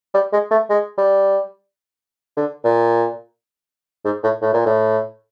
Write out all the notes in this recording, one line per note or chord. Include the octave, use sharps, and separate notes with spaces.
G3
G#3
A3
G#3
G3
D3
A#2
G#2
A2
A2
A#2
A2